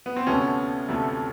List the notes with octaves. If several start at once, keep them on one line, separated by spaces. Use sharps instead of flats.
B3
C4
D2 C3 F3 A3 B3 C#4
D2 C3 F3 A3